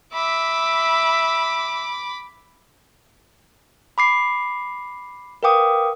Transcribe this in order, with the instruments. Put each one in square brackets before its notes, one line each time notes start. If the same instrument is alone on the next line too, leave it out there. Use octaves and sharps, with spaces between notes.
[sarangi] E5 [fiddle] B5 D6
[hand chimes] B5 D6 C7
A#4 B4 F5 G5 D6 D#6